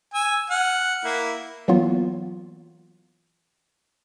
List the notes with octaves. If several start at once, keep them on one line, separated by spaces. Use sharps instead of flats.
G#5 E6
F#5 F6
A#3 E4
E3 F#3 A#3 B3 F4